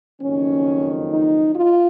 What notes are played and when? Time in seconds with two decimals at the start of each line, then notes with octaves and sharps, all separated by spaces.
0.20 F#1 F2 D#3 C#4
1.09 D#4
1.53 F4